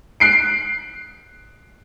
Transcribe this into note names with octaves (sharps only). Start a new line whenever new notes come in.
F#6 C7 D7